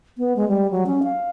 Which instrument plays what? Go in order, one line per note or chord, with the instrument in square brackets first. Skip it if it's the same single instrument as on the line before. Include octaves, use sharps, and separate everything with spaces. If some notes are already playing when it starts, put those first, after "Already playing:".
[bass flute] B3
G#3
G3
F#3
C#4
F5